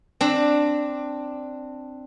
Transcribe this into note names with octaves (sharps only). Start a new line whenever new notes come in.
C4 D4